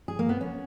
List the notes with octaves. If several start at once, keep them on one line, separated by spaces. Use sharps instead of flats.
G#4
A#3
B3
C#4